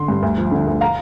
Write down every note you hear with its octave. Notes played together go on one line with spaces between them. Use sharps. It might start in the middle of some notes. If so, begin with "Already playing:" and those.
Already playing: D3 C6
G2
D2
F3
D3
D2
F5 A#5